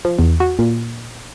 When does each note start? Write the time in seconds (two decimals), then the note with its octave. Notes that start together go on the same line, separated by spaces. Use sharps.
0.05 F3
0.19 E2
0.40 F#4
0.59 A#2